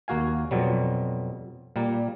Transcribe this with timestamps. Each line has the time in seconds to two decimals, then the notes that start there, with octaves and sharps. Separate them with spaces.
0.08 D#2 A#3 F#4 F5 G#5
0.51 F2 B2 F#3 G3
1.76 A#2 G3 A#3